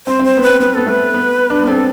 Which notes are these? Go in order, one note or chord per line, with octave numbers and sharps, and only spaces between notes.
C4 C5
C4
C5
B3
C4 B4
B3 B4
B3 A4
A3 B4
B3
D4
B3
C4 A4